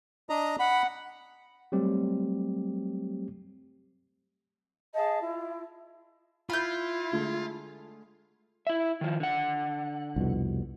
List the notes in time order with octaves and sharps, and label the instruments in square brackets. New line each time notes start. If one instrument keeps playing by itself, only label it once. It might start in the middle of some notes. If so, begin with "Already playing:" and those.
[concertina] D4 D#5 A#5
[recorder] F#5 [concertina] B5
[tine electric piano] F#3 G3 A3 C4 G4
[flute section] G#4 D#5 F5 A5
E4 F4
[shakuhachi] E4 [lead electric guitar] F4 [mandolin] B5 G6
[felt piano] D3 G#3 A3
[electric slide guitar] E4 E5
D#3 F3
D3 F#5
[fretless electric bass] C2 F2 B2